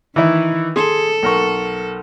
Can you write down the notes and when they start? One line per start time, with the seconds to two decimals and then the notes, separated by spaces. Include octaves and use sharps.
0.16 D#3 E3 D#4 E4
0.76 G#4 A4 C6
1.23 B1 A#4 C#6